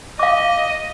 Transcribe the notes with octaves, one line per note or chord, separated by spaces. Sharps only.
D#5 F5 D6